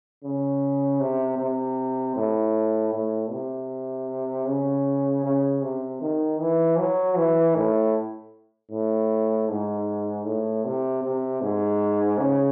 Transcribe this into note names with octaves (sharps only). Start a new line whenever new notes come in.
C#3
C3
C3
A2
A2
C3
C#3
C#3
C3
D#3
E3
F#3
E3
A2
A2
G#2
A2
C3
C3
G#2
C#3